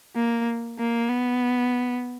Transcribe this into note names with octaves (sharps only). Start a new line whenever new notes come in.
A#3
A#3
B3